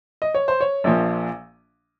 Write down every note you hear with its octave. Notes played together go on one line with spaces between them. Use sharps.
D#5
C#5
C5
C#5
A#1 A#2 F3